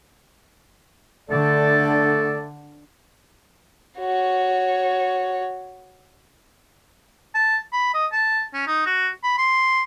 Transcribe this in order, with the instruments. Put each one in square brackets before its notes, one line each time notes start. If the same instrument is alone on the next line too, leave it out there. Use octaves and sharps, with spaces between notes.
[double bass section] D3 [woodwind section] A3 A4 D5
[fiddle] F#4 C#5
[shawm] A5
B5
D#5
A5
C#4
D#4
F#4
B5
C6